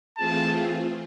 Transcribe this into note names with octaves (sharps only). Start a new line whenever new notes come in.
E3 A3 C4 F4 G#4 A5